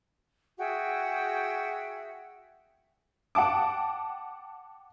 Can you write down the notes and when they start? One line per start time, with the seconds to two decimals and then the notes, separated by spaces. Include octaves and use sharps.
0.59 F#4 G#4 E5 G5
3.35 F#5 G5 A5 D6